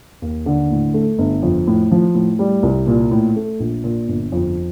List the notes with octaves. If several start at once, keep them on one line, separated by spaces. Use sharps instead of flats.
D#2
D3
A2
A3
G1
F2
A2
F3
A2
G3
C2
A#2
A2
A3
A#1
A#2
G1
F2